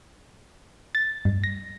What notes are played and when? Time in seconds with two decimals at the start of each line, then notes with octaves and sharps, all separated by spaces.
0.95 A6
1.25 G2
1.44 A#6